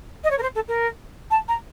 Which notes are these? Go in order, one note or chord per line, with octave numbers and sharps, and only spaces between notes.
D#5
C#5
A#4
C5
A4
A#4
A5
A#5